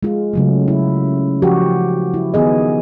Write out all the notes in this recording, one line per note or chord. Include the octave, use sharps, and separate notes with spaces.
G#3 F4
C#3 F#3 A3
E4
F3 F#4 G4
E4
D#3 B3 G#4 D#5